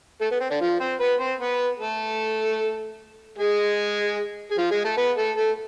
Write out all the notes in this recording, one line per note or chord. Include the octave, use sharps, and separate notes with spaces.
A3 A4
B3
C4
D3 D4
F3 F4
C4 C5
B3 B4
C4 C5
B3 B4
A3 A4
G#3 G#4
G#4
F3 F4
G#3 G#4
A3 A4
B3 B4
A3 A4
A3 A4